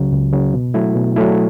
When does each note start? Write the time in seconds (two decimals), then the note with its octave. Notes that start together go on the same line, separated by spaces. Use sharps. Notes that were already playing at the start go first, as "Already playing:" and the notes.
Already playing: C#2 C#3 F#3
0.12 C#2
0.33 C#3 F#3
0.54 B2
0.74 F#3 A3 E4
0.95 B2
1.16 F#3 A3 E4